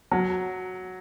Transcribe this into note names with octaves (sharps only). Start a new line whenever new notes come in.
F#3